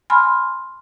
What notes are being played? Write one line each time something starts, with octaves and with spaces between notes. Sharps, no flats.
G#5 B5 C6 F6